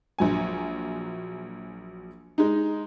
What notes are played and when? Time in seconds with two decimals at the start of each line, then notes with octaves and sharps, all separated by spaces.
0.18 A#1 F#3 G#5
2.38 G#3 D#4